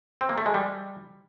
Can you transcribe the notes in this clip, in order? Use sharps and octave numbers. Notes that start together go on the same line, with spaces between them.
C4
A#3
A3
G#3
G3